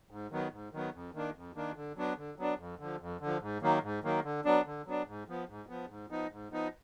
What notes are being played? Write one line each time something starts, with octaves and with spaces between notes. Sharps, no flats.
G#2
D#3 F#3 B3
G#2
D#3 F#3 B3
F2
D#3 A#3 D4
F2
D#3 A#3 D4
D3
F#3 B3 D4
D3
F#3 B3 D4
F2
D3 F3
F2
D3
F3
G#2
D#3 F#3 A#3
G#2
D#3 F#3 A#3
D3
F#3 B3 D4
D3
F#3 B3 D4
G#2
F3 B3
G#2
F3 B3
G#2
F3 B3 D#4
G#2
F3 B3 D#4